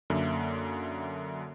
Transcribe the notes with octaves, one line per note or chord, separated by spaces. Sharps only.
F#2 D3 A#3 E5